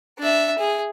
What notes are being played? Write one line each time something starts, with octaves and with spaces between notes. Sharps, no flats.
D4 E5
G#4